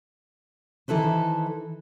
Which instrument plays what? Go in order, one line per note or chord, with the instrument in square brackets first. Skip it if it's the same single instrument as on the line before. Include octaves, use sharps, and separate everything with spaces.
[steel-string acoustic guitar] D#3 E3 E4 A4 B4 C5